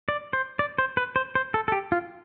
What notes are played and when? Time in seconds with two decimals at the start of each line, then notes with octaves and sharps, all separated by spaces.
0.09 D5
0.33 C5
0.59 D5
0.78 C5
0.97 B4
1.16 C5
1.35 C5
1.54 A4
1.68 A4
1.72 G4
1.92 F4